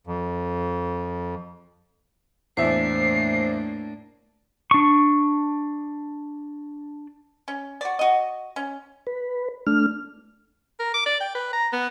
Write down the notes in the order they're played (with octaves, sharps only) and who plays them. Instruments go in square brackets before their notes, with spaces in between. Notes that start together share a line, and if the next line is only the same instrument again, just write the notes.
[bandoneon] F2
[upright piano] E2 E5 [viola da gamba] A2 A#3 D4 [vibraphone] C5 [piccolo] C7
[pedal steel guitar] D4 C#6
[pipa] C#4
F#4 D5
F#4 D#5
C#4
[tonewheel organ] B4
A3 D4 F6
[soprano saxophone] A#4
D6
D5
G5
B4
A#5
B3